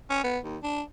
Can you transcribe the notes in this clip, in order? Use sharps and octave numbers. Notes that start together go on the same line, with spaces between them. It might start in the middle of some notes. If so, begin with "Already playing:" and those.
C#4
B3
D#2
D4